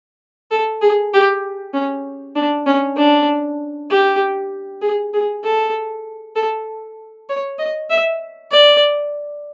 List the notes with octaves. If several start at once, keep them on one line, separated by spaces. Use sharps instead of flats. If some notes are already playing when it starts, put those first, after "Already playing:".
A4
G#4
G4
C#4
D4
C#4
D4
G4
G#4
G#4
A4
A4
C#5
D#5
E5
D5